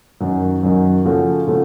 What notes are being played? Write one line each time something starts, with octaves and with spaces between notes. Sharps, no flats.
F#2 D#3 F#3
F#2 D#3 F#3
C#3 F3 A3 C#4 F#4
C#3 F3 A3 C#4 F#4